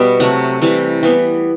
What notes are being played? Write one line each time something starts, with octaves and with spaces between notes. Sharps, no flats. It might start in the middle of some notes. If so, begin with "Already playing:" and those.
Already playing: B2 G3 B3 E5
C3 F#3 A3 F#5
C3 E3 G3
E3 G3 B3